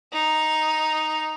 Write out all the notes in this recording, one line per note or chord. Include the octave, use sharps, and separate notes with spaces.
D#4